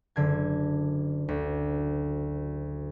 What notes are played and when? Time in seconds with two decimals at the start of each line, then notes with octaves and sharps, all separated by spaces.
0.16 F#1 D3 G#6
1.29 D2